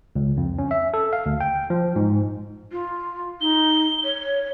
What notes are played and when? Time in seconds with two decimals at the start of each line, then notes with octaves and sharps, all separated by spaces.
0.16 C#2
0.37 F2
0.59 C#4
0.71 E5
0.94 A4
1.13 F5
1.26 D2
1.41 G5
1.70 F3
1.96 G#2
2.72 F4
3.41 D#4 G7
4.04 C#5